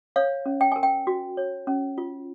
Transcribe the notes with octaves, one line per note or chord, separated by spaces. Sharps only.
C#5 F5
C#4
G5
A#4 G#5
G5
F#4
C#5
C#4
F4